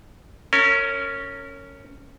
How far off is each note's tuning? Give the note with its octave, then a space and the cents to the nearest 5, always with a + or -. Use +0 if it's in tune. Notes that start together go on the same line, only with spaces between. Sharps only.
C#4 +0 A#4 -35